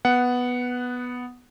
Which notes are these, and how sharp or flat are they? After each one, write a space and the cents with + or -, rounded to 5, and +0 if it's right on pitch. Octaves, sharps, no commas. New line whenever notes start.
B3 +0 F#5 +0